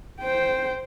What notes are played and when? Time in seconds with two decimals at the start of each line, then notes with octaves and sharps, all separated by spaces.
0.21 C5 G5